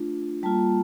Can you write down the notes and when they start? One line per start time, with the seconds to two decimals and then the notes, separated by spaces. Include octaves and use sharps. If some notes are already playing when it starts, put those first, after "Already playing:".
Already playing: A3 D4 F4
0.43 G3 A#3 F4 A5